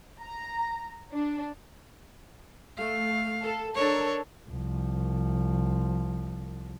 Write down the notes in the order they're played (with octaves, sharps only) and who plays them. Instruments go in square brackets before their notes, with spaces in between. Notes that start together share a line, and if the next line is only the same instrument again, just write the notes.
[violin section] A#5
D4
[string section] A3 [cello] F5
[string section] A4
[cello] D4 C#5 [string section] A4 A#4
[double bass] C2 F3